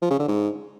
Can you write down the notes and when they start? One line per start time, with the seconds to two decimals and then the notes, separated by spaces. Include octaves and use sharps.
0.02 F3
0.11 C#3
0.19 D3
0.28 G#2